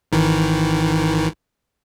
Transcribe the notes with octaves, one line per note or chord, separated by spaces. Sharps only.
G#1 D#3 E3